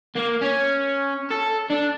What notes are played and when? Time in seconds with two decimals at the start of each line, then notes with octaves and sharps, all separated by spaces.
0.15 A#3
0.41 C#4
1.31 A4
1.70 D4